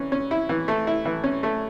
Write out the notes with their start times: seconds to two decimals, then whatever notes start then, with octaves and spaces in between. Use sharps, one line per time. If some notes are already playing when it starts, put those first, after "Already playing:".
Already playing: E3 C#4
0.12 C#4
0.31 E4
0.49 E3
0.68 A3
0.87 E4
1.05 E3
1.24 C#4
1.43 A3